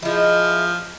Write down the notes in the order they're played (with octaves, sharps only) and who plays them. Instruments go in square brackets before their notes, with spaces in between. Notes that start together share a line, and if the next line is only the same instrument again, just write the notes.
[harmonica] F3 [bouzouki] G#3 E4